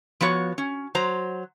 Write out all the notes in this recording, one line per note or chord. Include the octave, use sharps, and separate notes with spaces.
F3 B3 F#4 C#5
C#4
F#3 C5 A#5